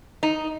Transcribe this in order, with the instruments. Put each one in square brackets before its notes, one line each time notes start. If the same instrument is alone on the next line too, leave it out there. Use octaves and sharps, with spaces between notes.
[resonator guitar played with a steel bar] D#4